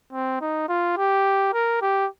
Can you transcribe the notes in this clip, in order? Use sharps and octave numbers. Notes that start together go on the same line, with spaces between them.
C4
D#4
F4
G4
A#4
G4